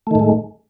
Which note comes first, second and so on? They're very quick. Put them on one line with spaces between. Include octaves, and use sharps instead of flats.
A3 D#3 A2 G#3